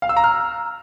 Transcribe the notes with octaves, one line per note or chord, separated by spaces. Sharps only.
F5
E6
A#5
F6